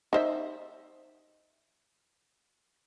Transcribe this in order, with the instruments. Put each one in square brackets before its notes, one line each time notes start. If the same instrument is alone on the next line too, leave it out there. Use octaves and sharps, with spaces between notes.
[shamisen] D#4 C5 E5